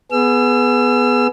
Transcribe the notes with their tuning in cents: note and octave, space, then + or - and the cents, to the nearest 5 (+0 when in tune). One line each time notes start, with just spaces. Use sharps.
B3 +0 G#4 +15 E6 +35